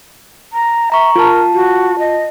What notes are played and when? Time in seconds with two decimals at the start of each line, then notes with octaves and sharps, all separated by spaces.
0.53 A#5
0.92 E5 A#5 C#6
1.16 F4 A#4 A5
1.54 F#4
1.99 D#5